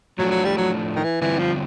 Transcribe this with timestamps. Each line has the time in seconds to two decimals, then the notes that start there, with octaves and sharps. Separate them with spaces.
0.19 A2 F3 F#3 A3 D4
0.31 F#3
0.45 G3
0.58 F#3
0.95 D#3
1.04 E3
1.21 D3 E3 G3 C4 F4
1.39 F3